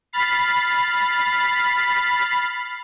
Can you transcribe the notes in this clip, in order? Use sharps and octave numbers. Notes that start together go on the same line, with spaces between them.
B5 F6 A6 B6 C7